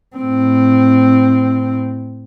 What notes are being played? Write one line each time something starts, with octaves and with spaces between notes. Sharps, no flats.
A2 C4